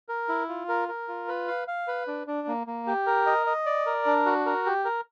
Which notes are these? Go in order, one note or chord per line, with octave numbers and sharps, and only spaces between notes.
A#4
E4
F4
A#4
A#4
F4
B4
F5
F5
B4
D4
D4
A#3
A#3
G4
A#4
D#5
D#5
D5
A#4
D4
F#4
A#4
G4
A#4